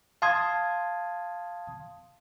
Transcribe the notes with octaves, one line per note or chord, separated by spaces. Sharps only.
F5 A5 C6 D#6 G#6